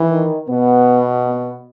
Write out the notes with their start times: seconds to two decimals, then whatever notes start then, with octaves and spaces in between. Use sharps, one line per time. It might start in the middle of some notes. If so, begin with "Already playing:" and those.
Already playing: E3
0.11 D#3
0.49 B2 B3
1.27 B3